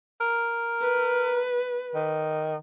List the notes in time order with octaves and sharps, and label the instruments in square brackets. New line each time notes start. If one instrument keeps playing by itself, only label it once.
[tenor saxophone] A#4
[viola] B4
[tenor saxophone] D#3